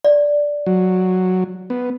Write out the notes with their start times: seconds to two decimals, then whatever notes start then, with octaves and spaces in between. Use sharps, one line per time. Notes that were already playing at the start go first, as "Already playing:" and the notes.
0.04 D5
0.66 F#3
1.70 B3